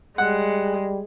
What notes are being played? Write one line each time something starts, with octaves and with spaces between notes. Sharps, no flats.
G3 G#3 F#5